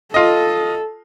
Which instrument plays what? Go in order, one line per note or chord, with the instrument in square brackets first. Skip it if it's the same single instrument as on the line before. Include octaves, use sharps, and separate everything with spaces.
[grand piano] F4 D#5 [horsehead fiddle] A4